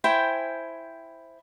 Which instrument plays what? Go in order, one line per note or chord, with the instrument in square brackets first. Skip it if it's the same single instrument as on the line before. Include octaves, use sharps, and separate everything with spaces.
[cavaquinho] E4 C5 G5 G#5